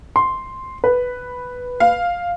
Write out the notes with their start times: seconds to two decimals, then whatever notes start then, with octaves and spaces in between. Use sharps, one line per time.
0.16 C6
0.84 B4
1.80 F5